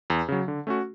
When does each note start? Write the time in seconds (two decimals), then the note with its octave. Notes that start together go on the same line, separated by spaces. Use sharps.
0.10 E2
0.28 C#3 F#3
0.48 D3
0.67 A3 C#4 F#4